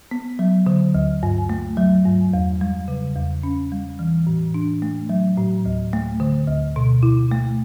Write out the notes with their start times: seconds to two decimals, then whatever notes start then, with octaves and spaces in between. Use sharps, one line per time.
0.11 B3
0.39 F#3
0.66 D3
0.94 D2
1.23 G2
1.49 A3
1.77 F#3
2.06 G2
2.33 E2
2.61 G3
2.88 C#3
3.16 E2
3.43 C#4
3.72 G3
3.99 E3
4.27 A2
4.54 D4
4.82 A3
5.10 F#3
5.38 A2
5.66 D2
5.93 A3
6.20 D3
6.47 D2
6.76 B2
7.03 E4
7.31 A3